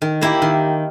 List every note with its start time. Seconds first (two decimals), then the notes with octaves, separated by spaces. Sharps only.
0.02 D#3
0.21 A#3 E4 G4
0.42 D#3